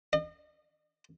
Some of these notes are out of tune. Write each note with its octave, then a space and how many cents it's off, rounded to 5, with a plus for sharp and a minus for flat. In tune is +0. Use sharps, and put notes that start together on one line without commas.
D#5 -40